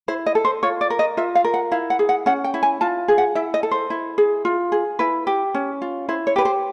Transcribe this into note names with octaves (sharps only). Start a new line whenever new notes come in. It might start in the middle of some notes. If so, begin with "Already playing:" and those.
E4 C5
D#5
A4
C5
F4 C#5
D5
A#4
D#5
F4 E5
F5
A#4
F#5
E4 F5
F#5
G#4
F#5
C#4 F#5
G5
E4
G#5
F4 A5
G#4
F#5
E4 E5
D#5
A4
C5
E4
G#4
F4
G#4
E4 B4
G4
C#4
F4
E4 C5
C#5
G4 B4
C5